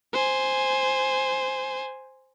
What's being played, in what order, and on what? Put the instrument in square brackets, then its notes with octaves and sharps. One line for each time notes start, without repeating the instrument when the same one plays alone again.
[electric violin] C5 G#5